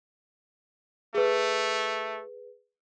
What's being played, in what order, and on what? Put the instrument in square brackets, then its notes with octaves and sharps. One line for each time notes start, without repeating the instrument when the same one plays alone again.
[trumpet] A3 [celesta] G#4 B4